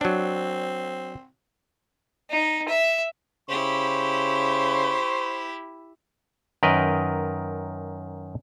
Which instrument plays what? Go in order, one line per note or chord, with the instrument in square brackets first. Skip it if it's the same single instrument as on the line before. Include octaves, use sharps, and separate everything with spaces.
[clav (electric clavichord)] F#3 D4 [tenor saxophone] C4
[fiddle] D#4
E5
[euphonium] C#3 [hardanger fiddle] E4 G4 [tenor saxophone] C5 [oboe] C#6
[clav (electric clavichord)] F#2 D#3 A#4 B4 D#5 G5